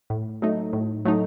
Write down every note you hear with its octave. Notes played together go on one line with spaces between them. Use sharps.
A2
F#3 A3 D#4
A2
F#3 A3 D#4